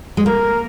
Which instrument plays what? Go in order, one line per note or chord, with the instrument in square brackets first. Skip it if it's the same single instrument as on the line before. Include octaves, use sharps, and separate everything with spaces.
[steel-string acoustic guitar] G#3
[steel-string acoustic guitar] A#3 [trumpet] A#4